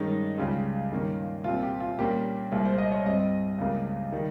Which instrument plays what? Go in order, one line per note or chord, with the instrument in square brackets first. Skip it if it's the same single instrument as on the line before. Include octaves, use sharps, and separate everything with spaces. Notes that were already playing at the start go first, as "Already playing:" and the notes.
Already playing: [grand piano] G2 D#3 G#3 C#4 D#4
C#2 C#3 G3 F4
G2 D#3 A#3 C#4
C2 A#2 G3 C4 F4
G4
F4
A#2 G3 A#3 C#4 G4
C2 A#2 G#3
C5
D#5
C#5
G2 G3 C4 D#5
C#2 C#3 G3 A#3
D#3 G3